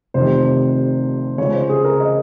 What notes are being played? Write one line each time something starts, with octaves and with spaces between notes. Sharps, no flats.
F1 F2 C3 D#3 C5
C#2 C#3 C#5
C5
G#4
A#4
D#5